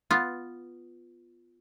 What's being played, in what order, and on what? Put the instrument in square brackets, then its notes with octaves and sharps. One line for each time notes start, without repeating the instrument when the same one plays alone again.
[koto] B3 F4